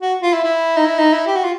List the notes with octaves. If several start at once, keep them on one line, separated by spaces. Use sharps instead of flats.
F#4
F4
E4
E4
D#4
E4
D#4
E4
G4
F#4
F4